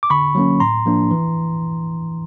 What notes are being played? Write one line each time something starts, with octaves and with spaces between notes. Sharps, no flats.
D6
D3 B5 C#6
F#3 A#3 C#4
A2 A#5 C6
F3 A#3 D4
E3